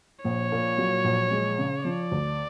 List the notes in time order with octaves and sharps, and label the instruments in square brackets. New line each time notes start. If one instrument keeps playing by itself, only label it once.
[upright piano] A#1 [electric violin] C#5
[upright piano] A#2
F#3
A#1
G#3
C#3
[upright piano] F3 [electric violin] D5
[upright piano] D2